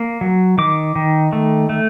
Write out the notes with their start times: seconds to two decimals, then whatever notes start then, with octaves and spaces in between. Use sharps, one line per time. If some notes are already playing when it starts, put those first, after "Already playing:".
Already playing: A#3
0.21 F#3
0.58 D#3 D6
0.95 D#3
1.33 A3
1.69 A3